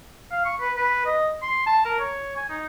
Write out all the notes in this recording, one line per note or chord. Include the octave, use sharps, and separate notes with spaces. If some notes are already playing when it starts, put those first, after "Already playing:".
F5
C#6
B4
B4
D#5
C6
A5
A#4
C#5
G#5
D#4